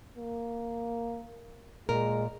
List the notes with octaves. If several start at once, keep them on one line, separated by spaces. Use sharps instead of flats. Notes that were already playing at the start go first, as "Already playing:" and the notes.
A#3
A#2 G#3 A#4